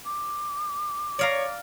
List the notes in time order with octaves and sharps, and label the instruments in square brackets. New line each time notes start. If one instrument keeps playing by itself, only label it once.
[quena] D6
[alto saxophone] C#5 [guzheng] D5 F5 A#5